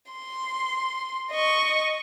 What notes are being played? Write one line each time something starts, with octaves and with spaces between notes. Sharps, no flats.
C6
D#5 C#6